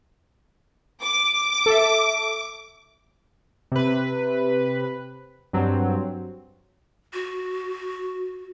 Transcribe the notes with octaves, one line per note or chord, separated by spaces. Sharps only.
D6
A4 E5
C3 B4
G2 F#3 C4
F#4